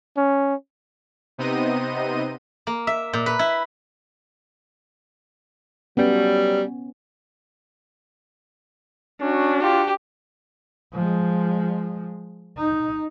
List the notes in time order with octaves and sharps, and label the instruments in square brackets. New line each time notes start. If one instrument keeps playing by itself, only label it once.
[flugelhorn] C#4
[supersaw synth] C3 B3 C4 D#4 D#5 D#7
[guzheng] A#3
E5
A#2
B4
E4
[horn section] F#3 G3 [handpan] B3 C#4
[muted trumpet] C#4 [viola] D4 F#4
[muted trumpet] F4 [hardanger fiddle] G4
[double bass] F3 G#3
D#4